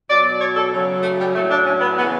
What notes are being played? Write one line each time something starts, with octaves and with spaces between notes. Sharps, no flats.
B2 F#3 D5
C#5
A4
C#3 F#3
A3
G3
A2 F#3 A3
D4
C#4
B3
C#3 E3 B3